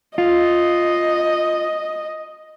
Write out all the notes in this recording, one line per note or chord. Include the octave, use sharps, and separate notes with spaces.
F4 D#5